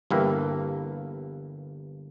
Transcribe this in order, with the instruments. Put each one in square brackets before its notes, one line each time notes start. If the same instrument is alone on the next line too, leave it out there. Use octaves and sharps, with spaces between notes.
[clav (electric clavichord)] G1 G2 E3 A#3